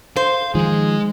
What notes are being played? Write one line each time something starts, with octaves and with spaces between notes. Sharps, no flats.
C5 F5
D#3 F3 G#3 G#4